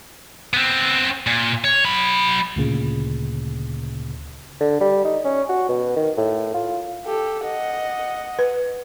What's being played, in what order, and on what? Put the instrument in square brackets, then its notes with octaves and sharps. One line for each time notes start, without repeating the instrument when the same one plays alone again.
[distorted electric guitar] B3 C4
A#2
C#5
F#3 B5
[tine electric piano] D2 A#2 C#3
[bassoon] D3
G3
D#4
C#4
F#4
B2
D#3
A2
F4
[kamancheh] G4 A4
D#5 F#5
[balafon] B4